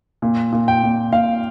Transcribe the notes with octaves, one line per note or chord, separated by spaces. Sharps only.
A#2
A#2
G5
A#2
A#2 F5